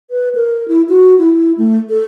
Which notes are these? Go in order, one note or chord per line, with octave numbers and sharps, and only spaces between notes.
B4
A#4
E4
F#4
E4
A3
A4